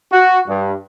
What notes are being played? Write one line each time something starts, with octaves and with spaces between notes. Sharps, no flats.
F#4
G2